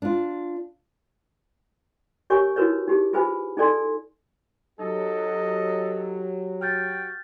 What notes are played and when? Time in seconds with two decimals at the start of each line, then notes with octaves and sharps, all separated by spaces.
0.02 D4 F4
2.30 G4 A#4 C#5 G#5 C#6
2.56 D#4 E4 F#4 A#4 B4 C#5
2.87 D#4 G4 G#4
3.13 F4 G#4 B4 C5 G#5 B5
3.57 D#4 G#4 A4 D5 G#5 C6
4.79 F#3 D#4 G4 A4 D#5
6.61 F#4 G5 F6 G6 A6